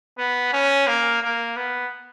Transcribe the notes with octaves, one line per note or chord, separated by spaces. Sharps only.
B3
C#4
A#3
A#3
B3